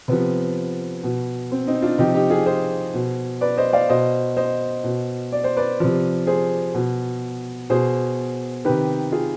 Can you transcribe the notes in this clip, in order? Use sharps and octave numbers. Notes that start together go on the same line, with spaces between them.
C3 F3 B3
B2
C4
C4 D#4
D4 F4
C3 F3 D#4 G4
D#4 G4
F4 G#4
G#4 C5
B2
B4 D5
C5 D#5
D5 F5
B2 C5 D#5
C5 D#5
B2
D5
C5
B4 D5
C3 F3
G#4 C5
B2
B2 G#4 C5
C3 D#3 G4 B4
F4 G#4